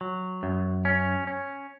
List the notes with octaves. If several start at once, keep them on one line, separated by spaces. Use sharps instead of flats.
F#3
F#2
C#4
C#4